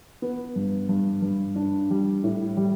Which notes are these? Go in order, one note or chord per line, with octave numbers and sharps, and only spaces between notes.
B3
G2
G2
G2
D4
G3
A2
G3